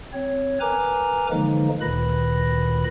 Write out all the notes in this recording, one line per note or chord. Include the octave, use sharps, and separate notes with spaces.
C4 C#5
A#4 B4 G#5 A#5 D6
D3 E3 F3 G#3 A#3 D#4
D2 A#2 D#3 B4 B5 A#6